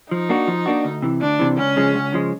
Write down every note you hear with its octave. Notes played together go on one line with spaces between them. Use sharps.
F3 D#4
A#3 D4 F#4
F3
A#3 D4 F#4
D2
C3 E3
D2 D4
C3 E3
C#2 C#4
C#3 F3 G#3
C#2
C#3 F3 G#3